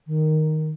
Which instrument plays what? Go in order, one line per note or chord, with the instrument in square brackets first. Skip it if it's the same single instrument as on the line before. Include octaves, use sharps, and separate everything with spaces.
[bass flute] D#3